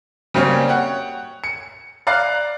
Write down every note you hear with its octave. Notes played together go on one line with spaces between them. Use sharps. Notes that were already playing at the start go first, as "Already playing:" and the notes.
C#3 F#3 G3 A#3 C4 C#4
C#5 F#5 G5
C#7
D5 F5 A#5 F6 F#6 C7